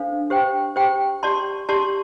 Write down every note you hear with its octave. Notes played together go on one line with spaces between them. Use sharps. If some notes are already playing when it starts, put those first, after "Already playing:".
Already playing: D4 A4 C5 F5
G4 C5 G5
G4 C5 G5
G4 D5 A5 C6
G4 D5 A5 C6